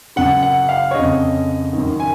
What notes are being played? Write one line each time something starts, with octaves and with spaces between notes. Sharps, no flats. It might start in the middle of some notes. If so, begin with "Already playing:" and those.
F#2 C#3 F#5
F#5
F5
C#5
F2 C#3 D#5
F#2 D#3
G#5